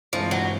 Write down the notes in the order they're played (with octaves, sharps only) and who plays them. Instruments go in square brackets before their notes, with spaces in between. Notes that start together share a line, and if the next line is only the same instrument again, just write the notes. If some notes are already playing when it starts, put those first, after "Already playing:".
[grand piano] G2 E3 G#3 C4 [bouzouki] F3
[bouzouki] F#3